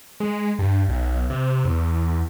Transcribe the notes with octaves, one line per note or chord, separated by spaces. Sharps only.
G#3
G2
B1
C3
E2